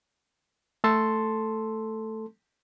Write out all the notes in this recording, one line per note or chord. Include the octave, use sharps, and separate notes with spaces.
A3 A4 A5 C6